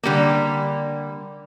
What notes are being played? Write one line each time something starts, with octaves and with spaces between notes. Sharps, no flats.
D3 G3 A#3